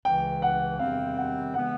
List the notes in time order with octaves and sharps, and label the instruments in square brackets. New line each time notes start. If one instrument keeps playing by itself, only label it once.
[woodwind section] C#2 C#3 E3 [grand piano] G5
[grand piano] F#5
[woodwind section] E2 C3 D#3 G3 C4 [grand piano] F5
[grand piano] F#5
[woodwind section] C#3 E3 G#3 B3 [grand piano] F#5